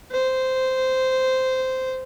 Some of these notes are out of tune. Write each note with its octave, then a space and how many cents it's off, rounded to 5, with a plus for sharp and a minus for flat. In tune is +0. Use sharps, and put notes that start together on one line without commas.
C5 -10